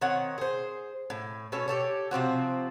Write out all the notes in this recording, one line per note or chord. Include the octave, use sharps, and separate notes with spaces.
D#3 C4 C#5 F#5
G#4 C5
A2
B2 C#4 A4 C#5
G4 A4 C#5
C3 F3 C4 F#4